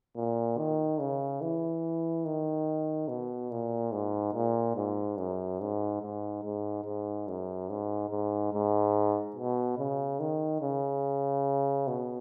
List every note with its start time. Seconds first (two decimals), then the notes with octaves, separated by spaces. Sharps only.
0.16 A#2
0.58 D#3
1.00 C#3
1.41 E3
2.25 D#3
3.08 B2
3.51 A#2
3.92 G#2
4.34 A#2
4.75 G#2
5.17 F#2
5.60 G#2
6.02 G#2
6.44 G#2
6.84 G#2
7.28 F#2
7.69 G#2
8.10 G#2
8.53 G#2
9.36 B2
9.78 C#3
10.20 D#3
10.61 C#3
11.87 B2